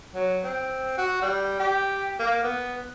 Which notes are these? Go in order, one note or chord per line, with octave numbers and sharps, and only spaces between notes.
F#3
C4
F#4
G3
G4
A#3
B3